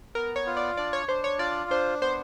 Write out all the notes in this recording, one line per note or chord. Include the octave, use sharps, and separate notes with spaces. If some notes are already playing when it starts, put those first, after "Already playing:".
B3 A#4
C#5
F4
D5
D4 D5
C#5
D4 C5
C#5
F4 D5
D4 C5
B3 C5